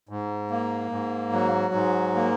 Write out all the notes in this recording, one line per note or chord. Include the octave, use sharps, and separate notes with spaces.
G#2
A#3
G#2
F#3
G#2
A#3